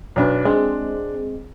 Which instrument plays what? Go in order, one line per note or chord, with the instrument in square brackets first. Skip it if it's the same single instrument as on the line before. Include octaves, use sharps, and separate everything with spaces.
[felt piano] B1 D4 B4
[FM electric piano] G#3 C4 [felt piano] D4